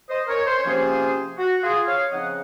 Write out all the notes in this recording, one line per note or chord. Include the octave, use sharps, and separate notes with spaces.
C5 D#5
A#4 C#5
C5
C#5
C3 F3 A#3 C#4 F4 G#4 C5
F#4
F4 G#4
C#5 F5
C#3 F3 C4 D#4 D#5 F#5